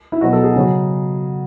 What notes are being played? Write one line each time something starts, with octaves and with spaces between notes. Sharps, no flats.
E4
B2 F#3 B3 F#4
A4
G#4
C#3 F#3